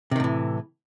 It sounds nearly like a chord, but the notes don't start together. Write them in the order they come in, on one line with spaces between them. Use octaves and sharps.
C3 D#3 A2 E3